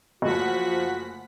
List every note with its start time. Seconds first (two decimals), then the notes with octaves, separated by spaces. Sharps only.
0.22 F#1 F3 A3 F#4 F#5 B6